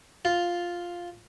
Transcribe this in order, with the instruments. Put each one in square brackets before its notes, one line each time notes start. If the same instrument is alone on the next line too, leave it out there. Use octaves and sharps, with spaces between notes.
[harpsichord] F4